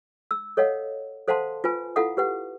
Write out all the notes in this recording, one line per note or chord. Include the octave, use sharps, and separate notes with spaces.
E6
A4 C#5 D#5 F5 F#5
A4 C5 F5 F#5 A5 C6
F4 B4 G#5
E4 F4 A4 F5 F#5 D#6
G4 B4 F#5